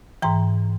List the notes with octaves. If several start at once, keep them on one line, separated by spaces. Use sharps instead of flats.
G#2 E3 G5 A#5